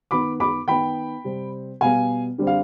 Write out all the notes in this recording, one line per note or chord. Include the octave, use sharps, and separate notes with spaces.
D#3 B3 B5 D6
B5 D6
D#3 B3 G5 B5
C3 G3 C4
B2 G3 B3 F5 G#5
D3 G3 C4
F5